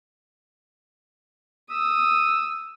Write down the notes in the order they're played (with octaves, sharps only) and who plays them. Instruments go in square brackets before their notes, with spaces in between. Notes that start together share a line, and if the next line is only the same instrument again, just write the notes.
[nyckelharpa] D#6 [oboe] E6